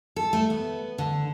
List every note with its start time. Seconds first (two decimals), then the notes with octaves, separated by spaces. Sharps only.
0.16 A4
0.33 A3
0.50 B3
0.98 D3